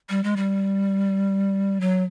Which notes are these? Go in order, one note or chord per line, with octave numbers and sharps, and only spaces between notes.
G3
G#3
G3
F#3